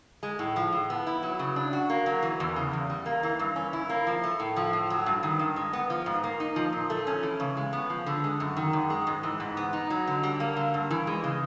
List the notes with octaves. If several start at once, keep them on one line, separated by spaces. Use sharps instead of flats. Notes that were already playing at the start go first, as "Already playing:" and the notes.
G#3
A2
F3
A2
B3
E4
F#3
C#3
D4
F#4
A#3
F#3
E3
E2
C#3
E2
G3
A#3
E3
G2
C#4
E4
A#3
F3
A3
A2
F3
A2
F#3
G2
D#3
G2
G#3
B3
F3
G#2
A#3
D#4
F3
A#2
A3
C#4
E3
C#3
G#3
B3
F3
D3
G#3
F#2
D#3
F#2
G#3
G#2
E3
G#2
B3
D#4
F#3
D3
G3
A#3
D3
G2
E3
G#3
C#3